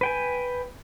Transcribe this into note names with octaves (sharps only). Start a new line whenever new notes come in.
B4 G5 G#5